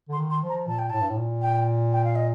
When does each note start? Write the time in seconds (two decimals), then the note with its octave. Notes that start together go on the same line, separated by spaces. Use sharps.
0.09 D3 C6
0.18 D#3
0.31 C6
0.43 F3
0.49 A#5
0.67 A#2 A5
0.79 G5
0.90 A2 A5
1.01 G2
1.10 A2
1.17 A#2
1.42 G5
1.92 G5
2.04 F5
2.16 D#5